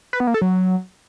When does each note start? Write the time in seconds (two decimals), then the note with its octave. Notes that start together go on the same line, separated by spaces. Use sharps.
0.13 B4
0.20 B3
0.27 A#3
0.34 A4
0.41 F#3